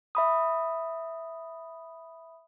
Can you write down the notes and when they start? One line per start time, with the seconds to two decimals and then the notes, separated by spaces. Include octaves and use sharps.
0.15 E5 B5 D#6